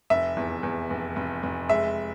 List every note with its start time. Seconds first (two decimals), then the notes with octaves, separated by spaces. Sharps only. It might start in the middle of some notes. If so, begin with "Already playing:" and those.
0.10 F1 E5
0.37 E2
0.63 E2
0.90 F1
1.16 F1
1.43 F1
1.69 G#3 E5